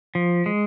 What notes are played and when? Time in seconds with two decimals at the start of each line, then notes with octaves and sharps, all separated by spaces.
0.15 F3
0.46 G#3